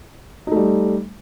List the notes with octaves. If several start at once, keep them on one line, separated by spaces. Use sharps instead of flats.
G3 A3 D#4